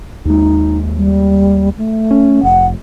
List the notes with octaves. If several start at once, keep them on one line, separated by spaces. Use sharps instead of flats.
D#2 G#3 D#4
G3
A3
C#4
F1 F#5